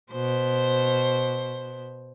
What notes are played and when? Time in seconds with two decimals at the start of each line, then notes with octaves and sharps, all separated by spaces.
0.12 B2 C5